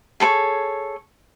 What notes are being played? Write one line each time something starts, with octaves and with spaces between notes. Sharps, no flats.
G#4 A4 B4 C#5